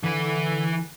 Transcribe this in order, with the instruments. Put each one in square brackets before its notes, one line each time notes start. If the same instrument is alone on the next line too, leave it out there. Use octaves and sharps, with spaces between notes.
[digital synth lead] D3 [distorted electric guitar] E3 B4